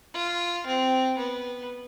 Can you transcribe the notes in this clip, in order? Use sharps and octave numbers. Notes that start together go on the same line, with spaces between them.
F4
C4
B3